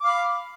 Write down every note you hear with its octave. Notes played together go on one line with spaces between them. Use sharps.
F5 B5 D6